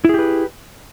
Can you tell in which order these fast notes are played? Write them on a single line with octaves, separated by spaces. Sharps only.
E4 G#4 G4 B4